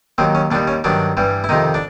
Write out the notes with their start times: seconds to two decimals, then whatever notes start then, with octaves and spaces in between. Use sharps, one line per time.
0.18 D#2 D#3 F#3 C4
0.35 C#4
0.51 D#2 D#3 G3 D4
0.68 C#4
0.84 G2 D#3 F#3 D4
1.17 G2 E3 G3
1.44 E4
1.49 F2 C3 D#3 D#4
1.74 D4